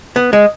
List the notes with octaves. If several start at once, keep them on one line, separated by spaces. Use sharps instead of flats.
B3
G#3